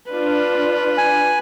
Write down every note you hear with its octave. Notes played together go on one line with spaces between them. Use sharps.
D4 F4 B4
G#5